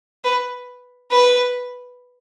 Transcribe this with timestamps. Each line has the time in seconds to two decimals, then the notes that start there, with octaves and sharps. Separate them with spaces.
0.25 B4
1.11 B4